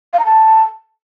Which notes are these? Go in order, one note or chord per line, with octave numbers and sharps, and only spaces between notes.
F5
A#5
A5